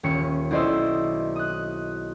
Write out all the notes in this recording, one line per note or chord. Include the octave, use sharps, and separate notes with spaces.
D#1 C#4 C#7
B1 E4 C5 D5 D#5 E6
D#6 F#6